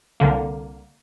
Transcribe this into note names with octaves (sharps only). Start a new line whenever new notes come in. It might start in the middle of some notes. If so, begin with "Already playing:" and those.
C2 D3 A#3